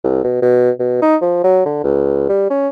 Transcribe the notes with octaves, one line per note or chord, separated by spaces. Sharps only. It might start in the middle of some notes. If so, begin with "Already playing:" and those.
C2
B2
B2
B2
D#4
F3
F#3
D3
C#2
G3
C#4